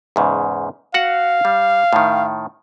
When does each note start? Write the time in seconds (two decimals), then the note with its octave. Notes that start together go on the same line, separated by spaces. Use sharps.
0.16 E2 G#2 C#3
0.94 F#4 F5 F#5
1.45 G3
1.93 A2 D#3